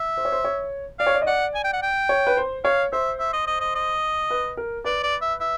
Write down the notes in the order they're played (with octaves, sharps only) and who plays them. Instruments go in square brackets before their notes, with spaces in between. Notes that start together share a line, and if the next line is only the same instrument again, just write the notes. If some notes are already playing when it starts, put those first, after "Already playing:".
Already playing: [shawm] E5
[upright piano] C5
C#5
C5
C#5
[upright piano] D5 [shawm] F5
[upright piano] C#5
D5
D#5
[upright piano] D5 [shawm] F#5
[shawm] G#5
G5
F#5
G5
[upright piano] C#5
B4
C5
[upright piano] C#5 [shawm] F5
[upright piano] C5 [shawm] E5
[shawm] E5
D#5
D#5
D#5
D#5
[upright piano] B4
A#4
[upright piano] B4 [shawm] D5
[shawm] D5
E5
E5